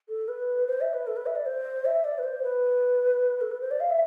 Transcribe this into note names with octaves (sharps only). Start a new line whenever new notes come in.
A4
B4
C5
E5
B4
A4
B4
E5
D5
C5
E5
D5
B4
C5
B4
A4
B4
C5
D5
F5
E5